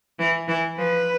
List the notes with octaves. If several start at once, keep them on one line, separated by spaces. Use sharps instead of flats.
E3
E3
F3 B4